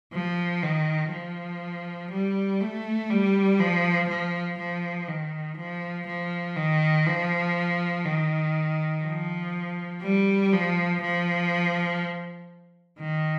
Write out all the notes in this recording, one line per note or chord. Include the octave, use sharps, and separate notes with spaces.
F3
D#3
F3
G3
A3
G3
F3
F3
F3
D#3
F3
F3
D#3
F3
D#3
F3
G3
F3
F3
D#3